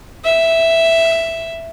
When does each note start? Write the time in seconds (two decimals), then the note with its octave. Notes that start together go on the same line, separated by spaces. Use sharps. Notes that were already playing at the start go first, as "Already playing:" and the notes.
0.24 E5